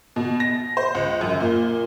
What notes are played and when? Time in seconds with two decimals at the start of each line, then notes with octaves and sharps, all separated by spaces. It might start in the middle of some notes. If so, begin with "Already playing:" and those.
0.16 B2
0.40 A#6
0.77 C5
0.95 C#2
1.21 F#2
1.40 A#2